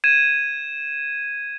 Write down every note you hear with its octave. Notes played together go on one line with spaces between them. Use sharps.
G#6 D#7 E7